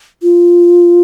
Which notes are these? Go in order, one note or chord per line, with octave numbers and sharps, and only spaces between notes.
F4